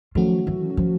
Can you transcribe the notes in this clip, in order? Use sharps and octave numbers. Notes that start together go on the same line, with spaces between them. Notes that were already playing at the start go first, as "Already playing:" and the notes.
D#3 F3 F#3 A3 C#4 F#4
E3
F3